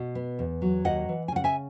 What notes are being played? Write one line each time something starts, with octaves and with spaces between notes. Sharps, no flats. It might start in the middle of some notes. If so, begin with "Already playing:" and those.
Already playing: B2
B3
E2
F#3
D#2 D#5 F#5
E3
G#5
C#3 F#5
E5 G#5